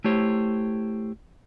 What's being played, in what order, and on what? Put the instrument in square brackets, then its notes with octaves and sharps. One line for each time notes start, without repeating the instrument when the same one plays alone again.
[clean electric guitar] A3 E4 G4 C5 C#5